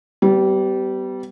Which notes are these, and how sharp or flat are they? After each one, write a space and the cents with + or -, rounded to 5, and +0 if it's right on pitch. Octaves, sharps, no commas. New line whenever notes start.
G3 -25 B3 +30